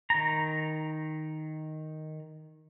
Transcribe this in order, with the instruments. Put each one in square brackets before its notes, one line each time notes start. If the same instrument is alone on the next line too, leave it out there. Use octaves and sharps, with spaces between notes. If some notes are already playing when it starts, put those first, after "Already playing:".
[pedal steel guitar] D#3 A#5